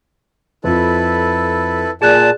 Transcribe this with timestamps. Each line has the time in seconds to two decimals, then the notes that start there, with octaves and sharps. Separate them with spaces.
0.64 F2 E4 F4 A4 B4
2.02 A#2 G#4 D5 G#5 A5 F#6